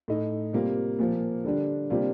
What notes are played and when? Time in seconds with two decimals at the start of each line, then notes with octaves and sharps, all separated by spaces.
0.08 A2 A3 D#4
0.53 C3 G3 A#3 F4
0.99 A#2 F3 A#3
1.45 D3 G3 D4
1.90 C3 G3 A#3 D4 F4